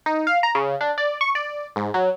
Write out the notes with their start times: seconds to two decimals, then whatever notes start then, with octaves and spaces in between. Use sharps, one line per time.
0.06 D#4
0.27 F5
0.43 A#5
0.55 C#3
0.81 D4
0.98 D5
1.21 C#6
1.35 D5
1.76 G#2
1.94 F#3